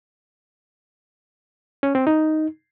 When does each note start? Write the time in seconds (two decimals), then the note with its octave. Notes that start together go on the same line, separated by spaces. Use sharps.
1.83 C#4
1.95 C4
2.07 D#4